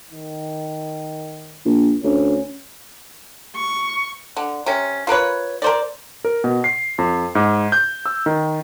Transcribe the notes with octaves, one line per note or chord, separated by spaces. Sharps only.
D#3
A#1
D2 C#4
C#6
D3
C3 C#4
F4 A#4 B4 C#5
A#4 C5 D5
A#4
B2
C7
F2
G#2
G6
E6
D#3